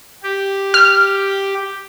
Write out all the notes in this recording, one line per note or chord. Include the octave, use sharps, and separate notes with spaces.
G4
F6